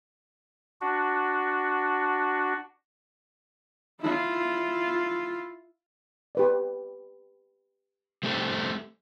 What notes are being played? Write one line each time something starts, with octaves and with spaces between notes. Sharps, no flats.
D4 F#4
E4 F4
G4 B4 D5
G3 A3 C4